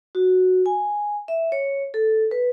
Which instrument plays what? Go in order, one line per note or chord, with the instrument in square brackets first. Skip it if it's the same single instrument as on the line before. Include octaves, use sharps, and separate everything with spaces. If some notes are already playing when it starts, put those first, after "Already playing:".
[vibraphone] F#4
G#5
E5
C#5
A4
B4